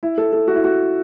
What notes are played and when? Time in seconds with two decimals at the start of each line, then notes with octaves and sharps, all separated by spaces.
0.03 E4
0.18 A4
0.33 A4
0.48 F#4
0.55 E4
0.64 F#4